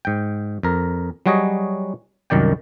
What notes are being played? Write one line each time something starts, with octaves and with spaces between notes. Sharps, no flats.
G#2 G5
F2 A#4
F#3 G3 F#4 G#4 C#5 D#5
C2 F#2 D#3 D5 G5